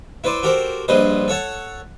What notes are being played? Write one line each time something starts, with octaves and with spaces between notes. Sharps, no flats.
E4 B4 C5 D5
F#4 G4 A4 A#4 C5
A#1 G2 G#4 B4 C5 D#5
A4 C#5 F#5 A5